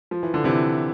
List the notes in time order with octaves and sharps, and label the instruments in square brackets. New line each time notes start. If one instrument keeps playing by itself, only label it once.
[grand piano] F3
E3
D3
C3 E3